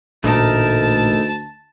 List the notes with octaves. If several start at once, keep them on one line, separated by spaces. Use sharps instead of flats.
A1 D2 A#2 A3 D#4 A#4 A5